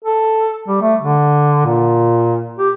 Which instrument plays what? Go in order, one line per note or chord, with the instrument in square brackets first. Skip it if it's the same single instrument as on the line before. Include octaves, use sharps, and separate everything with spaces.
[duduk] A4
G3
A3
D3
A#2
G4